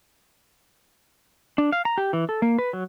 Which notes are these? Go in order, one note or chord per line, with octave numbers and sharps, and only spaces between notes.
D4
F5
A#5
G4
E3
A4
A#3
B4
F#3